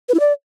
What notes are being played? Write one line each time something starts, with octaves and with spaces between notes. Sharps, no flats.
B4
E4
D5